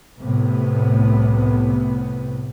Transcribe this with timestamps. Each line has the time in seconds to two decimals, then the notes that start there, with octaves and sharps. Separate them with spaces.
0.18 C2 A2 C3 B3